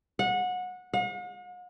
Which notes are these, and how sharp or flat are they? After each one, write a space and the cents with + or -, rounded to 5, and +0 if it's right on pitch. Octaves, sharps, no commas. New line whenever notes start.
F#5 -25
F#5 -45